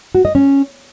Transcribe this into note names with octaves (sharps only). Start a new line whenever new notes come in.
F#4
D#5
C#4